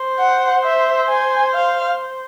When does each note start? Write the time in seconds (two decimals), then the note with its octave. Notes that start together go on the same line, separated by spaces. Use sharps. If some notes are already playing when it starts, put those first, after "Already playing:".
Already playing: C5
0.19 F#5
0.64 E5
1.09 G#5
1.54 F5